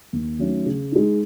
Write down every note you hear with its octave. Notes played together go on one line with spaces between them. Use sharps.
D#2
D#3 F#3 A3 C#4
C#3
G#3 D#4